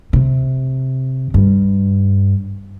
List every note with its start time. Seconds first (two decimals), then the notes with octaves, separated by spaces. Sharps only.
0.13 C3
1.34 G2